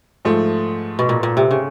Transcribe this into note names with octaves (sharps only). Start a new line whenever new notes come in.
G#2 F3 A3
B2
A#2
A#2
C3
C#3